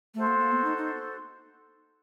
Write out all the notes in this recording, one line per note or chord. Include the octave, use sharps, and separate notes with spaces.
A3 F#4 A4 C5
A#3
A#3
B3
D#4
D#4